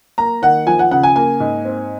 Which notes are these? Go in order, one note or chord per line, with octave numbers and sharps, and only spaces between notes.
A#3 A#5
D#3 F#5
F3 G#5
F#5
C#3 F#5
G#5
A#3 G#5
G#2
C4